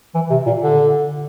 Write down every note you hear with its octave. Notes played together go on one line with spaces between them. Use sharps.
E3
C3
A#2
D3